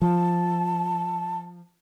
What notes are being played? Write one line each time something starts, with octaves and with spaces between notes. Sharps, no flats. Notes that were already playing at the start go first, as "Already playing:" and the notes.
F3 A5